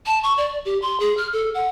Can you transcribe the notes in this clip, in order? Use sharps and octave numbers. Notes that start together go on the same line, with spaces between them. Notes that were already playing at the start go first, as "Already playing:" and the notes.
A5
C#6
D5
G4
C6
G#4
F6
A4
F#5